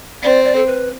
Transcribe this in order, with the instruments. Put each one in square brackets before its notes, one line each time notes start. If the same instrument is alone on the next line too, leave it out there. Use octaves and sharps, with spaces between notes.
[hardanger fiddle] C4 [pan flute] D5
[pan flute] D5
A4
B4